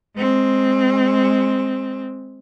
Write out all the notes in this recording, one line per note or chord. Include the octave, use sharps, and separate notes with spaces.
G#3 C4